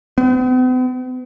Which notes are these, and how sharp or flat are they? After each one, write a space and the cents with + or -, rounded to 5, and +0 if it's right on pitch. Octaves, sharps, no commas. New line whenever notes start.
B3 +45